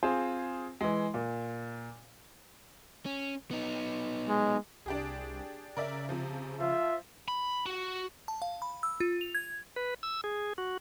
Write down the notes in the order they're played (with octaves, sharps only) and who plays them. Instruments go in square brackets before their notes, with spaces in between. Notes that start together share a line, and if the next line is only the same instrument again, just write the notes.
[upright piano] C4 F4 G#4 C5
E3 G#3
A#2
[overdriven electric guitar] C#4
B3 D#4
[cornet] G#3
[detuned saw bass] C2 [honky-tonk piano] D4 G4 G#4
[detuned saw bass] C#3 [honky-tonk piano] A#4 D5 E5
[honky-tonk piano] C3 F3
[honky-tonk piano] F3 [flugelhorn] F4 [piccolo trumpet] E5
[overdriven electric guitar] B5
F#4
[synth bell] A5
F5
B5
E6
F4
F7
G#6
[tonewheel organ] B4
E6
G#4
F#4